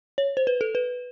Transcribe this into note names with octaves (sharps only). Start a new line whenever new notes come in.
C#5
C5
B4
A4
B4